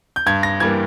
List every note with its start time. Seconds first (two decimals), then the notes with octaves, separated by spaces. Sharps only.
0.16 G6
0.26 G2 G#6
0.43 A#6
0.60 E3 G3 A#3 G#6